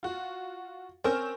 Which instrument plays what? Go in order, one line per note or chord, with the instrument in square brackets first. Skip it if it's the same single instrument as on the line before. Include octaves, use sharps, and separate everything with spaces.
[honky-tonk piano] F4 F#4
[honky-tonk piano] C4 C#5 [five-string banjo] C#4 A#4 C5